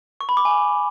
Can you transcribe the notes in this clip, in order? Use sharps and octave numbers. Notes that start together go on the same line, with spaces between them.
C#6
B5
D6
G#5